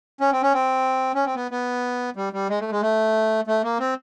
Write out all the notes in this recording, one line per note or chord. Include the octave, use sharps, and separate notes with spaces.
C#4
C4
C#4
C4
C#4
C4
B3
B3
G3
G3
G#3
A3
G#3
A3
A3
A#3
C4